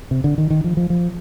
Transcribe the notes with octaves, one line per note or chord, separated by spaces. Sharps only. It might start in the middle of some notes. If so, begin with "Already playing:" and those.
C3
D3
D#3
D#3
F3
F3
F3